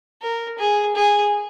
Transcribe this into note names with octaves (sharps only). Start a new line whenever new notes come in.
A#4
G#4
G#4